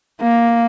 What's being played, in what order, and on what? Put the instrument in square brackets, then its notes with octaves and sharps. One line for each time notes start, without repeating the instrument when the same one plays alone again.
[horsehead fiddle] A#3